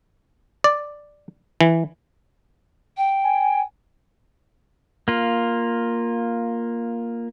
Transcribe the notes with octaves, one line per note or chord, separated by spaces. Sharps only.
D5
E3
G5
G#5
A#3 F4